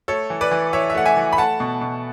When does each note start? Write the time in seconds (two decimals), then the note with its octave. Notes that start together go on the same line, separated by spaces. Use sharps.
0.08 A3 A4 C#5
0.30 E3
0.41 B4 D5
0.51 E3
0.73 E4 C#5 E5
0.90 E5
0.95 A3 F#5
1.06 E5 G#5
1.17 E3
1.33 B5
1.38 A3 F#5 A5
1.60 B2
1.81 B2